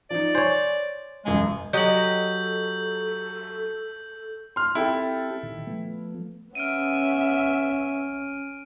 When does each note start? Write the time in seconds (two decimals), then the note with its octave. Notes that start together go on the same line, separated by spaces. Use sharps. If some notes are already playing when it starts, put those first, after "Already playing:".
0.10 F3 D#4 D5
0.35 C5 C#5 G#5
1.25 E1 F#2 G#3 G#5
1.73 F#3 G4 A4 D#5 G6 F#7
4.56 C6 F6
4.75 C4 E4 G4 A4 G5 A5
5.43 A#2 D#3
5.67 F3 A3 B3
6.55 B3 C#4 E5 F6 D7 D#7